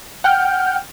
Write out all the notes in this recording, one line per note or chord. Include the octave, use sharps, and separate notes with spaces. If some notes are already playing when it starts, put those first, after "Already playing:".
F#5 G5 F6 G6